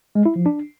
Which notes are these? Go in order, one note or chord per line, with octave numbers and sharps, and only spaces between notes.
G#3
E4
F3
D4